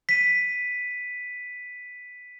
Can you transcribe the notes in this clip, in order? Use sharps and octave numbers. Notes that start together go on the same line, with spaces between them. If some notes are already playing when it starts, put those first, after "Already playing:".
B6 D#7